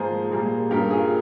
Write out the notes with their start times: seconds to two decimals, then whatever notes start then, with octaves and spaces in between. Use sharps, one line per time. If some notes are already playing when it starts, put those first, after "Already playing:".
Already playing: G#2 F3 A#3 G#4 C5
0.31 A#2 G3 A#3
0.71 G2 G3 A#3 G4 A#4
0.90 F4 G#4